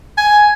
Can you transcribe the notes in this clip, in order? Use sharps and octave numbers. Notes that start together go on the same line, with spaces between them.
G#5